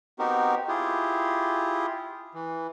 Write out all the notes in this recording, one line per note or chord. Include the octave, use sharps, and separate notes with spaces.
B3 C4 D#4 F#4 G4 A#4
E4 F4 G4 G#4
E3